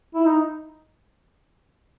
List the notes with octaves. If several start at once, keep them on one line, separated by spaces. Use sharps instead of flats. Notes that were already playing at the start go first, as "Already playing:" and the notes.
E4
D#4